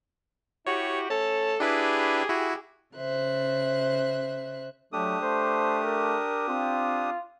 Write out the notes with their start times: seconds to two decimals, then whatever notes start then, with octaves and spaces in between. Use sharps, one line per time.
0.67 E4 F#4 G4 C#5
1.10 A3 C#4 A4 A5
1.60 D4 E4 G4 G#4 B4
2.29 E4 F#4
2.94 C#3 C5 E5 F#6
4.93 F#3 A3 D4 G4 D#6
5.21 A3 C5
5.84 A#4
6.48 C4 F4